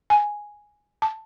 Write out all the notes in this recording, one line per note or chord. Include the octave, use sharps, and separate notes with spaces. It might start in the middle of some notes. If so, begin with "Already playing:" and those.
G#5
A5